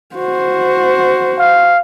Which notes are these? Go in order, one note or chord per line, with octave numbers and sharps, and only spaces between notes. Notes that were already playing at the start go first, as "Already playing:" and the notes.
F#4 C5
F5